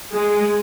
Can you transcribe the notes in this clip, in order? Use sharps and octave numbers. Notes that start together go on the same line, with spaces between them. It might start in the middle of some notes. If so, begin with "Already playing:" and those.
G#3